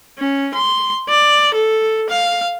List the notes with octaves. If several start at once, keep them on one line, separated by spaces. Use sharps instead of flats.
C#4
C6
D5
A4
F5